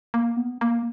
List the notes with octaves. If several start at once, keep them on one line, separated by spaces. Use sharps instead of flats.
A#3
B3
A#3